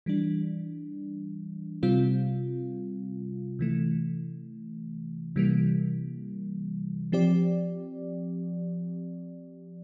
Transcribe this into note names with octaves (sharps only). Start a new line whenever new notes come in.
E3 G3 D4
C3 G3 C4 F4
C3 E3 A3
C3 E3 G3 A#3
F3 C4 G4 D5